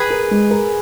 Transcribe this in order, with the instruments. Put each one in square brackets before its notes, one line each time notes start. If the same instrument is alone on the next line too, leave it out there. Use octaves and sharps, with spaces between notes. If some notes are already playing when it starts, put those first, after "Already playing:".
Already playing: [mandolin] G#4 B4
[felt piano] A#4
G#3
A#4